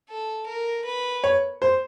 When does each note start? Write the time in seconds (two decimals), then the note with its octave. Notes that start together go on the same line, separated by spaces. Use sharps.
0.09 A4
0.46 A#4
0.85 B4
1.24 C#5
1.62 C5